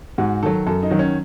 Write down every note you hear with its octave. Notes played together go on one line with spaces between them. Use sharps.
G#2 F#4
D#3 F#3 A4
F#2 A4
D#4
D#3 F#3
C#4